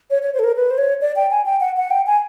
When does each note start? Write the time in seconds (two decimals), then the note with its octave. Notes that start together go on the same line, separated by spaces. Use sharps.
0.10 C#5
0.22 C#5
0.34 C5
0.39 A4
0.44 A#4
0.56 B4
0.71 C5
0.78 C#5
1.01 D5
1.16 G5
1.31 G#5
1.46 G5
1.60 F#5
1.77 F#5
1.91 G5
2.07 G#5